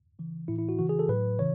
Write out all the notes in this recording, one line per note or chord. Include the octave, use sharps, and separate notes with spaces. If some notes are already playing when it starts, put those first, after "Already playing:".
C#3 E3
A2 E3 E4
E4
F#4
C#3 E3 F#4
G#4
A4
A2 F#3 B4
C#3 E3 C#5